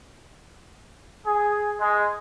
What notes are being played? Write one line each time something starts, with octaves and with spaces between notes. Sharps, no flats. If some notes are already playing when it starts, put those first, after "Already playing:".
G#4
G#3